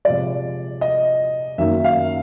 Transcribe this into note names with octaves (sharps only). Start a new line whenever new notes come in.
C3 F3 G#3 D5
D#5
F#2 D#3 F#3 A#3 D#4 E5
F5